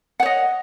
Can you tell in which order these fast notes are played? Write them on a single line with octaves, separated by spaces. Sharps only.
F#5 C#5 D#5